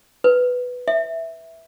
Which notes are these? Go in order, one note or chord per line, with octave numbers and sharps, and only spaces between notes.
B4
E5